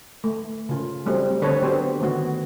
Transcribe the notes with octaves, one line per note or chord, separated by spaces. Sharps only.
A3
C#3 F4
F#3 G3 A3 C4
D3 C4 A4 B4 C#5
F#3 B3 D4 G4 C5
D3 D#3 A3 B3 F#4